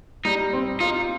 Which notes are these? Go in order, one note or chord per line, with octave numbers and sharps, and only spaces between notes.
G3 D#4
C4
D#4 F4